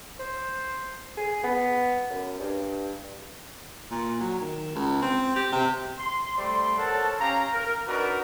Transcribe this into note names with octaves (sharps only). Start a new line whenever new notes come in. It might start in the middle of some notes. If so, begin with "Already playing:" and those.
C5
G#4
B3
F#2
G2
A#2
F#3
D#3
C#2
C4
G4
C3
C6
G3 A3 C5 D5 C6
A4 A#4 C5 C#5 F#5 A5
C#4 G4 F5 A#5
A#4
D4 D#4 F#4 A#4 B4 D5